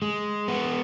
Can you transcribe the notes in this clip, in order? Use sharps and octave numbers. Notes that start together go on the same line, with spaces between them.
G#3
B3